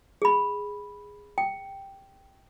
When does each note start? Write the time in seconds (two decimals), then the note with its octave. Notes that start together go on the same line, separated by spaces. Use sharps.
0.22 G#4 B5
1.38 G5